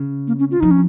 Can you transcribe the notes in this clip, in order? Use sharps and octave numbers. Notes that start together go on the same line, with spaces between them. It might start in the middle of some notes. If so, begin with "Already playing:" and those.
Already playing: C#3
A#3
C#4
F4
F3 D#4
C#4